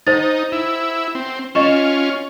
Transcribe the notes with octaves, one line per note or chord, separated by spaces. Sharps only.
D#4 C5 A6
E4
C4
C#4 F4 D#5 C#6 E7